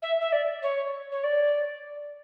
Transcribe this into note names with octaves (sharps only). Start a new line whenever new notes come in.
E5
E5
D5
C#5
C#5
D5